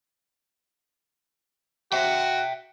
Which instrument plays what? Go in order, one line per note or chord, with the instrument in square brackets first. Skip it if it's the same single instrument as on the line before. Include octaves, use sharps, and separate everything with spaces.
[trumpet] F#4 [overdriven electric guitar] E5 G5